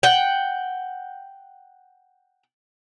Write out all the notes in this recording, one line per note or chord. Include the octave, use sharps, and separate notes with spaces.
F#5 G5